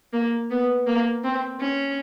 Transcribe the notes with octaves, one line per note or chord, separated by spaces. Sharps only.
A#3
B3
A#3
C4
C#4